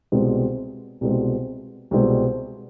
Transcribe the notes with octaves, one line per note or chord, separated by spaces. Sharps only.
C2 B2 G#3 C4
C2 B2 G#3 C4
C2 B2 G#3 C4